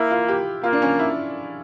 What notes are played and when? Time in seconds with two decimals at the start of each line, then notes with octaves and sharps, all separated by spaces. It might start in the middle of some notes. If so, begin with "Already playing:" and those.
Already playing: A#3 E4
0.11 F4
0.28 G4
0.64 A#3 F4
0.73 D4
0.82 C#4
0.99 E4